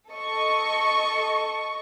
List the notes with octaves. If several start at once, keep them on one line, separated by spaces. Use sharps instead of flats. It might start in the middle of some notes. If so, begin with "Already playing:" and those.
A4 D#5 C#6